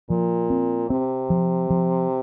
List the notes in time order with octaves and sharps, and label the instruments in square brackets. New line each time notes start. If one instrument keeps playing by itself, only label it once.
[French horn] A#2 [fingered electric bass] F3
[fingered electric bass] C4
[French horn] C3 [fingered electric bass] C4
[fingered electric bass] F3
F3